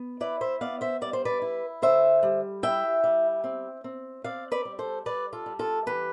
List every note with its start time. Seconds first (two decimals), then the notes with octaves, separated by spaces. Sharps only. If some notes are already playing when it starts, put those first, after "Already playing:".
Already playing: B3
0.20 E4 B4 D5
0.41 C5 E5
0.61 B3 D5 F5
0.81 C5 E5
1.01 G3 D5
1.13 C5
1.25 B4 D5
1.42 E4
1.82 D3 C5 E5
2.23 G3
2.63 E4 E5 G5
3.04 G3
3.44 C4
3.84 C4
4.24 C4 D5 F5
4.52 B4 D5
4.65 G3
4.79 A4 C5
5.05 G3 B4 D5
5.33 F4 A4
5.46 G3
5.59 F4 A4
5.86 E3 G4 B4